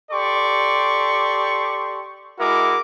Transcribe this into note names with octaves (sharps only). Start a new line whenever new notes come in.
G4 A4 D5 C6 C#6
G#3 E4 F#4 A#4 D6